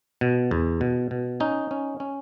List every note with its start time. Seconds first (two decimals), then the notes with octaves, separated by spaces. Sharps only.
0.21 B2
0.51 E2
0.81 B2
1.11 B2
1.40 C#4 D#4
1.71 C#4
2.00 C#4